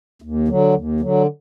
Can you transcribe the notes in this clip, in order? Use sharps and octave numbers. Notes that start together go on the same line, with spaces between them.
D#2
D3 F#3
D#2
D3 F#3